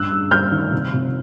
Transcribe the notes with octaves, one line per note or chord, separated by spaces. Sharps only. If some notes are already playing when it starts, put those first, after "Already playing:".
Already playing: G2 C#3 E6 F#6
G2
G3 F6 G6
D#3
F1
F1